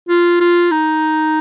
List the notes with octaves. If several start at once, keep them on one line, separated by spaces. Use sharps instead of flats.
F4
F4
D#4